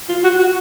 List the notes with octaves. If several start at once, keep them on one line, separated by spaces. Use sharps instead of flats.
F4
F#4
F#4